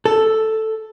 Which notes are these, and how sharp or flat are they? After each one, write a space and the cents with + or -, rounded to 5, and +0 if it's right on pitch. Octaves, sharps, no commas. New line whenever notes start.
A4 +0